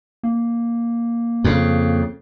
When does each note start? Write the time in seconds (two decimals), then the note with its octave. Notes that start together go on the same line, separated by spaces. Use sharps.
0.23 A#3
1.44 F2 C#3